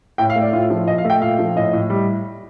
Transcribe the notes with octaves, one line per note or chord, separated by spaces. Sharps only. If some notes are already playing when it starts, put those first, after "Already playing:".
A2 G5
F5
A3
D5
A2 F4
F3
A#2 D#5
F5
A3
G5
A#2 F5
F3
A2 D#5
A2
G3